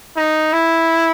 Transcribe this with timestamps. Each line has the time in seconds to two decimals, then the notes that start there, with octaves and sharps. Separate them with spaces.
0.16 D#4
0.53 E4